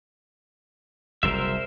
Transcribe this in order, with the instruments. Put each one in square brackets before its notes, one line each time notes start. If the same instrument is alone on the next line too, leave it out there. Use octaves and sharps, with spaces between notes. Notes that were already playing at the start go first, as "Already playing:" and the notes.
[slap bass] F#1 C2 [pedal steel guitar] A#4 C5 E5